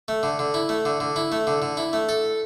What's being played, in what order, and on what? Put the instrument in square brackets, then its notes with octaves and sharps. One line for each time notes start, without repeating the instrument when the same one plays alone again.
[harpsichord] A3
D3
D3
E4
A3
D3
D3
E4
A3
D3
D3
E4
A3
A4